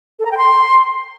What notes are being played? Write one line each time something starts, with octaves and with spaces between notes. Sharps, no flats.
A4
A#5
G5
C6